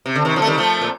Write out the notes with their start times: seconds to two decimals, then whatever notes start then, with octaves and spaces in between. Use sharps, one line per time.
0.06 C3
0.16 D3
0.25 C3 D#3
0.36 D3 F3
0.42 A3
0.47 D#3 G3
0.58 F3 A3
0.81 A#2